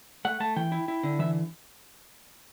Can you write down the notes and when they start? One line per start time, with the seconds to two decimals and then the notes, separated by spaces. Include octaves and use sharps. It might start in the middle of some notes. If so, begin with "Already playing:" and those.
0.25 A3 F#5
0.40 A3 A5
0.56 E3 G5
0.72 E4
0.88 E4
1.03 D3
1.19 E3 E5